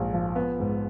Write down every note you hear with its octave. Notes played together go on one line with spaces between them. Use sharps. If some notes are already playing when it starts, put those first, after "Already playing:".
Already playing: A#1 G#2
F3
B3
G#2